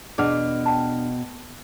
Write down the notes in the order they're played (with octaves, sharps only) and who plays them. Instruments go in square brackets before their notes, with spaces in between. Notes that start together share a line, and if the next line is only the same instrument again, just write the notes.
[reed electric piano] E2 D4 F6 [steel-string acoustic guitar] B2 [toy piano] G#4 F#5
[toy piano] G5 A5